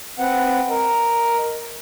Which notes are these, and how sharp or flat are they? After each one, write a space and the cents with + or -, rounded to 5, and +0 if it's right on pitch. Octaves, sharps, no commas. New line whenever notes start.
C4 +5 B4 +10 F#5 +0
A#4 +0 D#5 +0